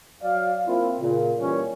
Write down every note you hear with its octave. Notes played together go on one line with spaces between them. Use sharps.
F#3 D5 F5
A#3 C4 E4 F4
A#2 C#3
A#2 E3 G3 C#4